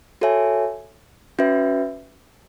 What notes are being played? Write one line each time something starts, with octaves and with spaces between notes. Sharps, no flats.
F#4 A4 C#5 E5 G#5
C#4 F#4 B4 E5